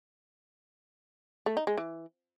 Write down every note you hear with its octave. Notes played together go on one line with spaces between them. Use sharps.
A3
D#4
G#3
E3